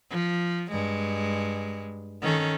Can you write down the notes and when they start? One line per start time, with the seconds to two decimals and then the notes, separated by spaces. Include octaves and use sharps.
0.10 F3
0.71 G2 G#3
2.22 D#3 C#4 A4